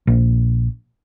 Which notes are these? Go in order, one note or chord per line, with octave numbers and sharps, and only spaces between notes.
A#1